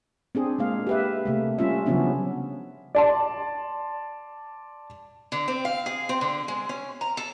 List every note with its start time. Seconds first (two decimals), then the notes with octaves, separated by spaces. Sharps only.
0.35 C4 D4 G#4
0.59 G#3 A#3 F5
0.87 G4 B4 E5
1.26 C3 A3 A#3
1.59 G3 C#4 F4 E5
1.86 C#3 F3 F#3 B3 C#4 D4
2.95 D5 A5 C6
5.32 D3
5.48 C4
5.65 F5
5.86 G#4
6.09 C4
6.21 D3
6.48 G#3
6.69 C#4
7.01 A#5
7.17 A4